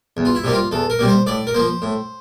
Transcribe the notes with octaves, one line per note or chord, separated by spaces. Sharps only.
E2
F4
E4
C3 G3 A#3
F4
E2 A4
A#4
C3 G3 A#3
C5
A2 D5
A#4
F3 A#3 C5
A2